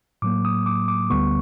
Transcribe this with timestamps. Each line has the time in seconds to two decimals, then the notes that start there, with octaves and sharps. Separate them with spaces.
0.22 A2 F#3 A#3 D6
0.45 D#6
0.66 D6
0.88 D6
1.10 D2 D3 G3 B3 C#6